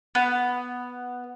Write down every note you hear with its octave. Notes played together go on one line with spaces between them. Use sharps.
B3